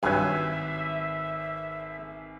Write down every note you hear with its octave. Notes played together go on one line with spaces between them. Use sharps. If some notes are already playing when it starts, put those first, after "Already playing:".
G#1 G2 F#3 B4 E5 G#5